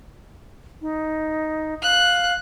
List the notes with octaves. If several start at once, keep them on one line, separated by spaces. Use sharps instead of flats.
D#4
F5 F#6